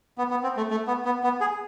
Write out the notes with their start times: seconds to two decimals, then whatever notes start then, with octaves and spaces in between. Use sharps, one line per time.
0.18 B3
0.30 B3
0.43 C4
0.57 A3
0.71 A3
0.87 B3
1.05 B3
1.23 B3
1.41 G#4